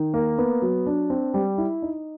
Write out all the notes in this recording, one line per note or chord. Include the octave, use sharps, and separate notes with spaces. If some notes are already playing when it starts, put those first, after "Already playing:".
Already playing: D#3
A#3
B3
F#3
D4
C4
G3
E4
D#4